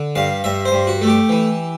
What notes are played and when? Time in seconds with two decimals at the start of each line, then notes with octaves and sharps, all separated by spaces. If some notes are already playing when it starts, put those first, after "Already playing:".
Already playing: D3
0.15 G2 F5
0.44 G2 E5
0.65 C5
0.72 G2
0.87 F#4
1.01 A3
1.07 G4
1.29 E3